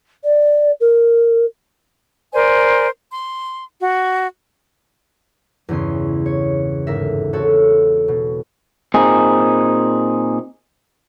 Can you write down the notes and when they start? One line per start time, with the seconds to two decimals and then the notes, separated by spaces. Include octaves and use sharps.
0.24 D5
0.80 A#4
2.34 A#4 C5 D5 G#5
3.12 C6
3.79 F#4
5.69 E2 G2 C#3 C#4 C6
6.26 C#5
6.87 G1 G#2 A#4 E5
7.33 C4 F#4 A4 C#5
8.08 B2
8.94 A#2 C4 D#4 G#4